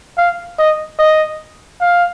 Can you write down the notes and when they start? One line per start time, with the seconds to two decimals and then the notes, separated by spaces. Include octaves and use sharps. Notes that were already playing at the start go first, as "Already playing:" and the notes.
0.17 F5
0.58 D#5
0.99 D#5
1.81 F5